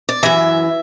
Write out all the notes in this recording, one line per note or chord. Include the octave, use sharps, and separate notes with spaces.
D5
F#2 E3 E5